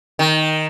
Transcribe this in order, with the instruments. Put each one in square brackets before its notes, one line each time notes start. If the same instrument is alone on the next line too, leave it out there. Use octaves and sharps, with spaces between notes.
[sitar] D#3